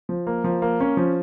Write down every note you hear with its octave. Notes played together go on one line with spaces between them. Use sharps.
F3
A#3
F3
A#3
C#4
F3